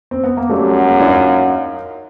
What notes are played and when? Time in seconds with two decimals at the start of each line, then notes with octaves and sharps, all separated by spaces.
0.11 C4
0.24 B3
0.37 A#3
0.49 F#2 G3 A3
0.88 G#3 A#3
1.01 D4 E4
1.08 F#4
1.13 D#4 F4